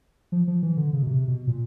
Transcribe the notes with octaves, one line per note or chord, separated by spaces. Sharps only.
F3
F3
E3
D3
C#3
B2
C3
B2
A#2